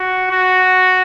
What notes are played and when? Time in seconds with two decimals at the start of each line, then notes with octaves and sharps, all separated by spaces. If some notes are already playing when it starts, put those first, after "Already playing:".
Already playing: F#4
0.31 F#4